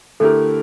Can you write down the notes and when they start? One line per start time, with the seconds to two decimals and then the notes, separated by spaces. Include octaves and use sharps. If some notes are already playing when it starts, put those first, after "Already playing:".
0.20 D3 A3 E4 G4 A4 A#4